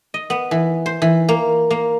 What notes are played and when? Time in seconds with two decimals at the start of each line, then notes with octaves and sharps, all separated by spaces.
0.14 D#5
0.30 B3
0.51 E3
0.86 C5
1.02 E3
1.29 A#3
1.71 A#3